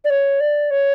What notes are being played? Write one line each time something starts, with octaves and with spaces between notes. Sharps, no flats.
D5
C#5
D5
C#5